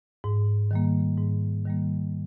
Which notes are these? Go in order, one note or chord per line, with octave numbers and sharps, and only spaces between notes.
G#2
D#3 G3 A#3
G#2
D#3 G3 A#3